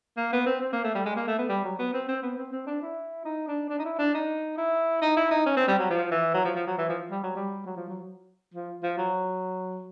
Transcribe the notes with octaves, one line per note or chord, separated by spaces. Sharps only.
A#3
B3
C4
C4
A#3
A3
G3
G#3
A#3
A3
B3
G3
F#3
B3
C4
C4
B3
C4
C4
D4
E4
D#4
D4
D4
D#4
E4
D4
D#4
E4
D#4
E4
D#4
C#4
C4
G3
F#3
F3
E3
F#3
F3
F3
F#3
E3
F3
G3
F#3
G3
F#3
F3
F#3
F3
F3
F#3